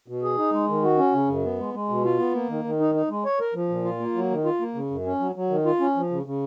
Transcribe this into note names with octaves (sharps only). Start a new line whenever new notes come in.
B2
G#4
D#4
G#3
D#3
F#4
C#4
C#3
F#2
B3
G#3
G#3
B2
F4
B3
A#3
D#3
D#3
D#4
D#4
G#3
C#5
A#4
F3
A#2
F4
A#3
F#3
D#3
F4
A#3
C#3
F#2
C#4
F#3
F#3
D#3
F4
C#4
F3
C#3
C#3